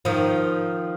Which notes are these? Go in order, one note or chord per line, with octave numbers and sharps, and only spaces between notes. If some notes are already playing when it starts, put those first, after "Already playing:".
D#3 F3